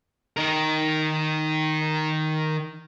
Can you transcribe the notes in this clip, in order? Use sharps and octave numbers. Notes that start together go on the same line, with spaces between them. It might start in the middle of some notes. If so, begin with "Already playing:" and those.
D#3 A#4